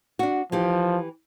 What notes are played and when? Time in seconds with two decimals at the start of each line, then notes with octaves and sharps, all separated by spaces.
0.19 D4 F#4
0.52 E3 F3 G4